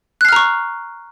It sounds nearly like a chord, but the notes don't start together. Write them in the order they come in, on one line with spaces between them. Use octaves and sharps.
F#6 C7 F6 A#5 C#6